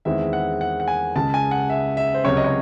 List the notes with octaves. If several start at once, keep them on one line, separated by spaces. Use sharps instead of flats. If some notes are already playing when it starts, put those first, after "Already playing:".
E2 D#3 G#3 C4 E4 E5
F#5
F#5
F#5
G#5
C#2 C#3 G#3 A5
G#5
F#5
E5
E5
C5
C#2 C3 F#3 C#4 C#5
D#5
C#5